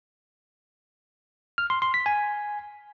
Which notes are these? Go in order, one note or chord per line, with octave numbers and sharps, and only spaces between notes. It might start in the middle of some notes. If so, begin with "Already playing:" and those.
F6
C6
C6
B6
G#5